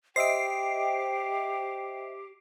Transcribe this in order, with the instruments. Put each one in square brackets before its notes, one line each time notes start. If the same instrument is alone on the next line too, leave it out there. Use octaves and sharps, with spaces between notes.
[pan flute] G4 [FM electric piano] C5 D#5 E5 [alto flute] G5 [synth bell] C7 D7